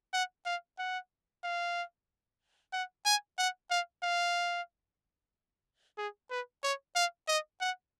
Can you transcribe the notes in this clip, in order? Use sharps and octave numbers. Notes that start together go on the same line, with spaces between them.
F#5
F5
F#5
F5
F#5
G#5
F#5
F5
F5
G#4
B4
C#5
F5
D#5
F#5